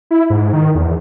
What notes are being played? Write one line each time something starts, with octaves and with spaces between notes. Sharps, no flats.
E4
G#2
D#3
E2